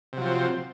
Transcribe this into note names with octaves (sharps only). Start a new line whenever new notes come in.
C3 F3 F#3 C4